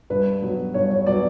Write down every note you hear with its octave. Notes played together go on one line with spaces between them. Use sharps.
G2 B4
F#3 B3
G2 C#5
C#5
F#3 B3 D5